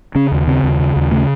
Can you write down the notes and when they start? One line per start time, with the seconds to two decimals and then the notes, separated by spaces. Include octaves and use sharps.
0.15 C#3 C#4
0.32 D#2
0.47 C#3 C4
0.64 D#2
0.79 C#3
0.96 D#2
1.11 C#3 A3